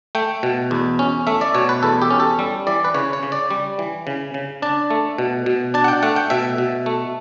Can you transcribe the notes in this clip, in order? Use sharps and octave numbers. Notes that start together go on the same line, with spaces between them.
A3 G5
B2
E2
C#4
A3 E5
D5
B2 C#5
B4
E2 A4
G4
C#4
A4
G3
E3 D5
B4
C#3 C#5
C#5
C#3
D5
G3
E3
C#3
C#3
D4 A5
A3
B2
B2
D4 A5
F#5
G5
A3 F#5
G5
B2 E5
B2
A3